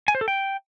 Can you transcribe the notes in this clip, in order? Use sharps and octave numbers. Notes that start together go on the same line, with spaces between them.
G#5
C5
A4
G5